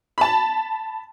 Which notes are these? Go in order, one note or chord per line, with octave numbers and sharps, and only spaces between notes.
A5 B5